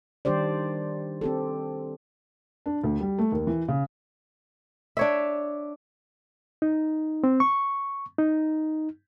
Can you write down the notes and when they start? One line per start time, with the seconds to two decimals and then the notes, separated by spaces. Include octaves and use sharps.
0.25 D#3 G3 D4 G4 C5 D5
1.21 C4 G4 A4
2.66 D4
2.84 D2
3.00 G3
3.19 A3
3.32 D#2
3.47 E3
3.68 C#3
4.97 D4 C#5 E5
6.62 D#4
7.24 C4
7.40 C#6
8.19 D#4